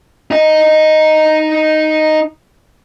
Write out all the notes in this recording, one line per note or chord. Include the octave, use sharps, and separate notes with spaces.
D#4 D#5